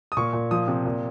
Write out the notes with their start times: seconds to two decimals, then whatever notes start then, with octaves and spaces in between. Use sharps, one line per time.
0.12 D#6
0.17 A#2 C#6
0.33 A#2
0.51 F3 D#6
0.68 C3
0.85 A#2